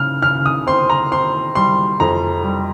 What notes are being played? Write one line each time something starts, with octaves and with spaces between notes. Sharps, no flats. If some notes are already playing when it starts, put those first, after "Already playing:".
Already playing: C#3 F6
C#3 F6
D#6
C4 C6
A#5
C4 C6
G3 C6
F2 A#5
G3